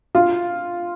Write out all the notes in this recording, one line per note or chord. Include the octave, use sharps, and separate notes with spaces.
F4